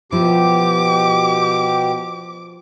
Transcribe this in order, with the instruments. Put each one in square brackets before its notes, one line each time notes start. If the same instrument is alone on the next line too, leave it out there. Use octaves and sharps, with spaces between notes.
[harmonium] B2 G4 [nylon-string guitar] F3 E4 [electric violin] D6